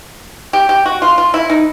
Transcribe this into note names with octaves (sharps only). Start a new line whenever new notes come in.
G4
G4
F#4
F4
F4
E4
D#4